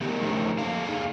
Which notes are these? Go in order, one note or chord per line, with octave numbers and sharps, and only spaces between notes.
A3 B3 G4 A#4
F3 A3 C#4 D#4 A#4 C5
F2 A#3 A4 F5
D#4 G#4 F5